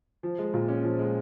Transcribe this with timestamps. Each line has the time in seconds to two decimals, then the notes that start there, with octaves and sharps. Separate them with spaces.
0.23 F3
0.39 G#3
0.54 A#2
0.68 C#4
0.84 F3
0.99 G#3